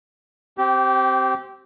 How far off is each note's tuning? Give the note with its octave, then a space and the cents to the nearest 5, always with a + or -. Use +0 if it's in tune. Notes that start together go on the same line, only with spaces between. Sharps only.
C4 +0 G4 -20